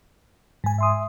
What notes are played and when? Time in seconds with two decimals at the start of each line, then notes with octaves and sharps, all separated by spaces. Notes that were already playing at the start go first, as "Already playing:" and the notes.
0.64 G#2 G#5
0.78 E5 C6 D#6